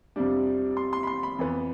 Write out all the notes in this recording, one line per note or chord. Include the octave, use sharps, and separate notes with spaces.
F2 C3 G3 D4
C6
C6
B5
C6
B5
F2 E3 B3